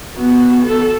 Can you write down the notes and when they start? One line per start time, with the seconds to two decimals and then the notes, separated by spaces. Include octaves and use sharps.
0.17 B3 F#4
0.66 A4